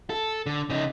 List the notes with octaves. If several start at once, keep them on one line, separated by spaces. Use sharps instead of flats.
A4
D3
C#3 D#4